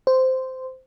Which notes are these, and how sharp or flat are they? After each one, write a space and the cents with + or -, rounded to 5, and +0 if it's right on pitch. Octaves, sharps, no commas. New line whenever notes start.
C5 -10